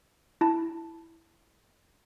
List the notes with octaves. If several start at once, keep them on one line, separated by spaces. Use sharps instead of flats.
E4 A5